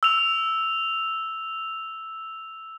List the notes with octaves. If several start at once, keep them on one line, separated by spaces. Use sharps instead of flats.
E6 F7